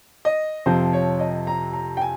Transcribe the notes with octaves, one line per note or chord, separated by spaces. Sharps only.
D#5
F2 C3 F3 C4 C5
C#5
D#5
A#5
A#5
G5
G#5